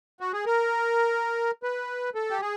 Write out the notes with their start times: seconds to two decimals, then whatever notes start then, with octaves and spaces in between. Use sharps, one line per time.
0.20 F#4
0.33 G#4
0.46 A#4
1.63 B4
2.15 A4
2.30 G4
2.41 G#4